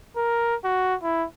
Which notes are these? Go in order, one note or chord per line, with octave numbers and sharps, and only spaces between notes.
A#4
F#4
E4